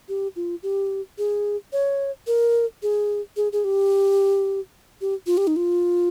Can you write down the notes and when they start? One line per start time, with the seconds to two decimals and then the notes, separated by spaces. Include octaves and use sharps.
0.09 G4
0.36 F4
0.63 G4
1.18 G#4
1.73 C#5
2.27 A#4
2.83 G#4
3.37 G#4
3.52 G#4
3.64 G4
5.01 G4
5.27 F4
5.37 G4
5.47 D#4
5.56 F4